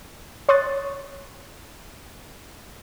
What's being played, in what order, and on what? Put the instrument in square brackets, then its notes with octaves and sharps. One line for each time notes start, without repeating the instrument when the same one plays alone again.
[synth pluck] C#5 C6 C#6 D#6 F#6 A6